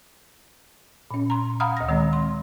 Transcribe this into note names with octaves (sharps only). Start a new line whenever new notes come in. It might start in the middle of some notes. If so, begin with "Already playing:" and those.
A#2 C#4
A#5 C6
F5 F#5 A#5 B5 D#6 F6
D2 A#6
D#3 G#3 C4
C6